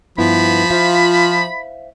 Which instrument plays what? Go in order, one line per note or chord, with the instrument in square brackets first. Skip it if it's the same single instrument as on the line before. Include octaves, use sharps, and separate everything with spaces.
[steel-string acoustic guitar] G2 B3 E4 [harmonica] F3 [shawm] B5
[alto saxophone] F4 [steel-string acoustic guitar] C5 E5 F5